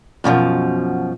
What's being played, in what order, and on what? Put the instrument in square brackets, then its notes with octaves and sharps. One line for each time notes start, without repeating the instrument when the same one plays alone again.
[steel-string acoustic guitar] F#2 B2 E3 F3